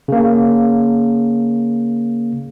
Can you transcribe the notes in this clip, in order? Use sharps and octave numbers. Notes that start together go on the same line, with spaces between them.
C#3 A#3